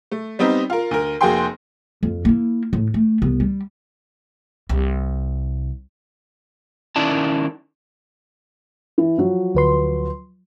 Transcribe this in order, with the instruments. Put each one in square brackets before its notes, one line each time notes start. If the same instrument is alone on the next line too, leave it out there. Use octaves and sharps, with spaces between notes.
[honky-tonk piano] A3
G3 B3 C4 D#4
F4 A#4
D2 A#4
F1 A#3 F#4 G#4 G5 C6
[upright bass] F2
A#3 E4
A2
A3
C2 B3
G3
C2
[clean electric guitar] D#3 C#4 E4 D5 A5
[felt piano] E3
F3 F#3
[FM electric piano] D2 B4 C6